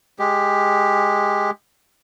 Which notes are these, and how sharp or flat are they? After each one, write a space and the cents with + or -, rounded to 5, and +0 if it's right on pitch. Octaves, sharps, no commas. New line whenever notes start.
G#3 +0 G4 +10